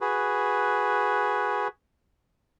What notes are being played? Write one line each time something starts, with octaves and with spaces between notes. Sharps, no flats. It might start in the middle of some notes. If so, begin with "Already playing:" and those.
F#4 G#4 B4